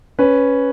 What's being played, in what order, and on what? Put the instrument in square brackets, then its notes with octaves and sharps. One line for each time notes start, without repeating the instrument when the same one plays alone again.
[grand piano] C#4 B4